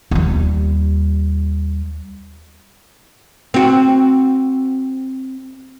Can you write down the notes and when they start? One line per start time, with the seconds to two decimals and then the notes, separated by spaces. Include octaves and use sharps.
0.11 D#2 G3
3.54 C4 F#4